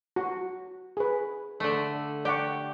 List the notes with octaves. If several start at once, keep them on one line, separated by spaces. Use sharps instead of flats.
F#4
G#4 B4
D3 A3
G4 D5 F#5 C#6